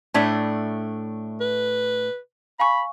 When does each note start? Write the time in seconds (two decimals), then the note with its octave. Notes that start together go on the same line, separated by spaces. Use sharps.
0.14 A2 A3 D4 A5 G#6 B6
1.41 B4
2.60 F5 G#5 B5 C#6